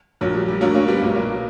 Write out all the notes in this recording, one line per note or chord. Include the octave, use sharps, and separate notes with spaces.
A#1 A#2 F#3
G3
G3
D2 D3 F#3 A#3
A#3 C#4
G3 B3
B1 A#2 G3
F#3 A#3